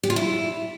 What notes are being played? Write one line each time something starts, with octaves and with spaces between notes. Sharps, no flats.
G4
F4
E4